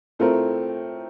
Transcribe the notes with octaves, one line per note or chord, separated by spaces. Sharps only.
A2 A3 C4 F4 A#4